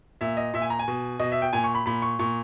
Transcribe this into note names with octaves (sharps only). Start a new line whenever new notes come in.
A#2 E5
D#5
A#2 E5
G#5
A#5
G#5
B2
B2 D#5
E5
G5
A#2 G#5
C#6
B5
A#2 B5
C#6
A#2 C#6